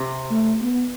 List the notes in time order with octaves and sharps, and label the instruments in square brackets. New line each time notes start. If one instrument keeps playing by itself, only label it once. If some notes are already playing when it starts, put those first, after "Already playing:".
Already playing: [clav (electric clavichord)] C3
[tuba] A3
B3